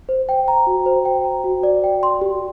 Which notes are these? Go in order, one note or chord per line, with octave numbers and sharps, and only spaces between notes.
C5
G5
A#5
F#4
C5
G5
A#5
F#4
D5
G5
C6
G4